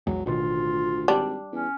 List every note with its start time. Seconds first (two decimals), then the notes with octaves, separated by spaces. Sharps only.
0.07 A#1 E2 F#3 G#3
0.26 A1 D2 B2 D#3 F4
1.08 G#1 G3 D4
1.52 E2 C#4